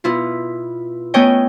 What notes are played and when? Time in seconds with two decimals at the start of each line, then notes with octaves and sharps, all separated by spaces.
0.04 B2 E4 F4
1.14 A3 B3 C#4 C#5 D#5 G5